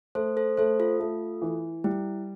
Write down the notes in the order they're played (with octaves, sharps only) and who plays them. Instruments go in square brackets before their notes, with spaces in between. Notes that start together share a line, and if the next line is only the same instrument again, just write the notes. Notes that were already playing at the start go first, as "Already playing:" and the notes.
[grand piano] A3 [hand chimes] A4 C5
[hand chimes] A4 C5
[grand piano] A3 [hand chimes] A4 C5
[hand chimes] F4 A4
[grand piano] A3
E3
[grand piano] G3 [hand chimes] E4